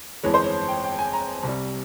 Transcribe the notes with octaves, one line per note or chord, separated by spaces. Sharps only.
G1 F2 E3 G#3 C#5
C5
C#5
G5
G5
G#5
A#5
C2 C3 G3